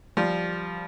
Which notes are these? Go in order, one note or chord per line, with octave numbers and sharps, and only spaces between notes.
F3 G3